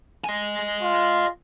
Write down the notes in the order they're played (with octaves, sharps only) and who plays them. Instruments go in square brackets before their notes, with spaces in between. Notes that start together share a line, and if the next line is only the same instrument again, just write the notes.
[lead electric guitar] D#5 G#5
[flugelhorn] F4